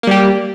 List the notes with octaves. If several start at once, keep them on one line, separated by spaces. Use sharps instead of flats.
G3 A#3 G4